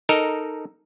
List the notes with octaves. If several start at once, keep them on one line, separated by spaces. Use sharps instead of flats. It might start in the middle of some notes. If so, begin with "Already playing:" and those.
D#4 A4 A#4 D#5